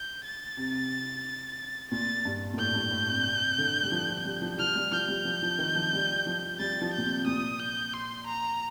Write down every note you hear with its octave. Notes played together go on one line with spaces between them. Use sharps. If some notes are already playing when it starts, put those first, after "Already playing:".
Already playing: G6
A6
C3
A#2 A6
G2
A#2
A2 G6
G2
A2
C3
C3
D3
G3
F3
F3
G3
F3
G3
F3 F6
G3
F3 G6
G3
F3
F3
D#3
F3
G3
F3
G3 A6
F3
A#2 G6
C3
A#2 D#6
G6
C6
A#5